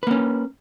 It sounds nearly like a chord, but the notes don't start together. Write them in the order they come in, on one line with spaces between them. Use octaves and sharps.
B4 A#3 C#4